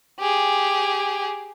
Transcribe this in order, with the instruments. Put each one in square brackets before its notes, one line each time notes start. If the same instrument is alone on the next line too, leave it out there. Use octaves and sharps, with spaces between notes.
[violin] G4 G#4